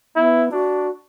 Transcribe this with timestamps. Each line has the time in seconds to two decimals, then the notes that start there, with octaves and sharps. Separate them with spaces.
0.16 B3 E4
0.52 D4 F#4